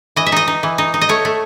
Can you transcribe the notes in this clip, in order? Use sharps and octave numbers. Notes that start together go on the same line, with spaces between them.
E3 D#5
E5
D#4 D#5
D#4
E3
D#4
D#4
D#5
A3 C#5
A3